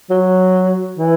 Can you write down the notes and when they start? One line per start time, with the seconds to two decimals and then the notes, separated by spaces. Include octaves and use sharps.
0.10 F#3
0.98 E3